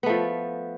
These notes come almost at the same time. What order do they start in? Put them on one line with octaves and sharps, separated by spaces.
B3 A3 F3